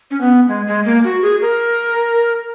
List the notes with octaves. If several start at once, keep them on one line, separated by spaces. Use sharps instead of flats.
C#4
B3
G#3
G#3
A#3
F#4
G#4
A#4